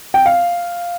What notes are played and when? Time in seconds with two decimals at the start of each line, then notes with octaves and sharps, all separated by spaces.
0.14 G5
0.26 F5